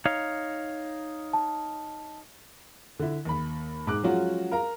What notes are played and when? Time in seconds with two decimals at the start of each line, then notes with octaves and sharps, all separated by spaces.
0.05 D#4 C#5 F5
1.33 A5
2.99 D3 E4
3.25 D#2 B5
3.87 G#2 D6 F#6
4.03 F3 F#3 G#3 C#4 F4 F#4
4.52 A#4 F5 A#5